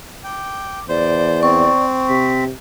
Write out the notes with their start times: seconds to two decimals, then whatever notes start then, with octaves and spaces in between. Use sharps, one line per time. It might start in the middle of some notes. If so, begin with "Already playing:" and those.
0.24 G5 D6
0.89 E2 C5 D5
1.43 C4 C#6
2.09 C3 B6